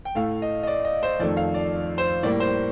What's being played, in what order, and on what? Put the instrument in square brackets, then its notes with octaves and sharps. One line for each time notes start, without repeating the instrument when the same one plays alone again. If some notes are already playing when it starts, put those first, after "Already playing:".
[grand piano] G5
A2 A3 F5
D#5
D#5
D5
D#5
C5
F2 D#3 A3 D5
F5
D5
C5
A2 G3 A#3 D5
C5